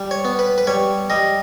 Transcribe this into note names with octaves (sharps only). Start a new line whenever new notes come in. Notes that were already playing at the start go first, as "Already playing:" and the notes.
Already playing: G3
C#5
B3
B4
B4
G3 C#5
G3 D#5